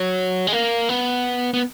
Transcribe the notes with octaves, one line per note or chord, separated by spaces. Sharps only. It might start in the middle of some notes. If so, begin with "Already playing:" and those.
Already playing: F#3
G#3
A#3
B3
B3